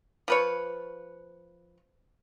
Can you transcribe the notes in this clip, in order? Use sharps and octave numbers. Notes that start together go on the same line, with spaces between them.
F3 B4 C#5